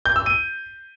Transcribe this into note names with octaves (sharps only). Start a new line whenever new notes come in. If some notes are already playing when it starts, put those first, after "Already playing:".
G6
E6
D#7